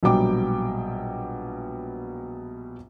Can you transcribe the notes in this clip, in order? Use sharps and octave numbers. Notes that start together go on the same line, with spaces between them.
A#1 B2 F#3 G3 G5 D6